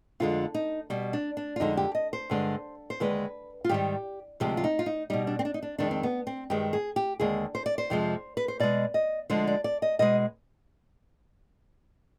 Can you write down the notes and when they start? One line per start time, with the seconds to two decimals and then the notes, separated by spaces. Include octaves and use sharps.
0.20 F2 D3 G#3 F4
0.54 D#4
0.90 B2 G3
1.13 D4
1.37 D4
1.56 F4
1.60 F2 D3 G#3 D#4
1.77 G4
1.95 D#5
2.13 C5
2.30 G2 D3 G#3
2.90 C5
3.00 D#2 D3 G#3 B4
3.64 F4
3.69 G#2 D#3 G3 G4
4.40 D2 C3 F3 G#3 G4
4.57 F4
4.64 D#4
4.79 F4
4.86 D#4
5.10 B2 G3 D#4
5.27 D4
5.39 C4
5.45 D4
5.54 D#4
5.62 D4
5.78 F2 D#3 G#3 D4
5.91 C4
6.03 B3
6.27 C4
6.50 G2 D#3 G#3 G4
6.73 G#4
6.96 G4
7.20 D#2 D3 G#3 G#4
7.55 C5
7.66 D5
7.78 C5
7.90 F2 C3 F3 G#3
8.37 B4
8.48 C5
8.60 B2 G#3 D5
8.94 D#5
9.30 D2 D3 F3 G#3 C5
9.47 D5
9.64 D5
9.82 D#5
9.99 B2 G#3 D#5